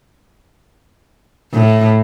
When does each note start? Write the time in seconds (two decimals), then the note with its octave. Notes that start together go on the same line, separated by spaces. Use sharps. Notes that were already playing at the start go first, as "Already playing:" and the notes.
1.53 A2